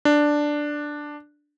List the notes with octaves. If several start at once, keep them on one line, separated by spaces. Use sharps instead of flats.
D4